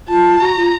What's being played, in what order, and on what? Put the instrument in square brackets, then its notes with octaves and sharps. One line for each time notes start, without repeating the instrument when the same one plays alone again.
[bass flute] F4 [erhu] A5
[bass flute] F#4 [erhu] A#5
[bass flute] F4